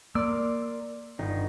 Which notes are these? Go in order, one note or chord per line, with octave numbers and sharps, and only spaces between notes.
A#3 A#4 D5 C6 E6
G1 D#3 D#4